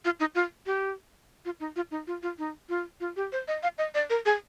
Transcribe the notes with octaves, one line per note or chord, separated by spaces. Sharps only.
F4
D#4
F4
G4
F4
D#4
F4
D#4
F4
F4
D#4
F4
F4
G4
C5
D#5
F5
D#5
D5
A#4
G#4